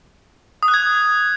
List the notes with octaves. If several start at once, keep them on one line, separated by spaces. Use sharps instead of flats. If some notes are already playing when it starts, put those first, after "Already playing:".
D#6
F#6
G#6